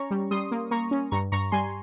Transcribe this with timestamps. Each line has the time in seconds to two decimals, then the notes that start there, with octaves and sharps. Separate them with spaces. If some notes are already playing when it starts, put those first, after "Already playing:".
Already playing: C#4 A#5 C#6
0.11 G3
0.31 G3 C6 D#6
0.51 A#3
0.71 A#3 A#5 C#6
0.91 C#4
1.11 G2 A#5 C#6
1.32 G2 A#5 C#6
1.52 G3 G#5 C6